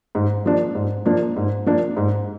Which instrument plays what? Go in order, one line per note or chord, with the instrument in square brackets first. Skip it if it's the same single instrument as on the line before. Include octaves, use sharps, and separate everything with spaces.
[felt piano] G#2
F3 A#3 D4
G#2
F3 A#3 D4
G#2
F3 A#3 D4
G#2